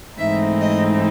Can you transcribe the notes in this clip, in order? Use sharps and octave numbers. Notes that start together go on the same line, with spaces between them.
G#2 E3 A3 C4 D#4 E5
D#5